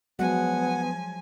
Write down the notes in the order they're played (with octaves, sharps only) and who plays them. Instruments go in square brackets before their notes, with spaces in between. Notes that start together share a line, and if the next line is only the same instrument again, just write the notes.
[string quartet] F3 G#5 [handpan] F#3 G#3 [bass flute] B3 [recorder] F#5